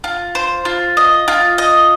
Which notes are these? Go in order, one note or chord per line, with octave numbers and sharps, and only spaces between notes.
F4
C5
F4
D#5
F4
D#5